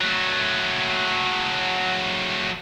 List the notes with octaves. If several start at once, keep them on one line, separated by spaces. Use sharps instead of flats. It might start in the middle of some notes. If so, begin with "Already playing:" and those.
F#3 A3